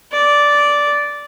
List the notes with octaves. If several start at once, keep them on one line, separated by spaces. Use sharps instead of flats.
D5